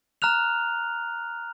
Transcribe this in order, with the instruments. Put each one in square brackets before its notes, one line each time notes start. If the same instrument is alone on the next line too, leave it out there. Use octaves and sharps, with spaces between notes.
[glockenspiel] A#5 F6 F#6 F7